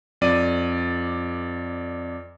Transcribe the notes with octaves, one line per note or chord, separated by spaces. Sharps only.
F2 D5 D#7